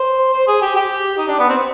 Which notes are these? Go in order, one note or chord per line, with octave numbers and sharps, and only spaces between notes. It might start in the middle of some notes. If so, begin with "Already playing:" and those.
Already playing: C5
C5
G#4
G4
G4
D#4
D4
B3
C4